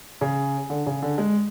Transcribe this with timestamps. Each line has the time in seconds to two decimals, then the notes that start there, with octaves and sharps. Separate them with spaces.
0.21 C#3
0.70 D3
0.86 C#3
1.02 D3
1.18 G#3